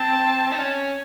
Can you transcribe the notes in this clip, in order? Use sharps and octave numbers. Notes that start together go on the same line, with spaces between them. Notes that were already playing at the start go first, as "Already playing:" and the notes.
Already playing: C4 A5
D#4
C#4